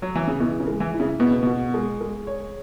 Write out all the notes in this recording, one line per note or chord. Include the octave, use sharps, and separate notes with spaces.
F#3
E3
C#3
B2 E3
C#3
G#3
E3
E4
C#3
B2 B3
C#3
B2 F#4
G#3
G#3
C#5